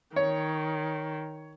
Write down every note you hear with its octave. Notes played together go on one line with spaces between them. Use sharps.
D#3 C#5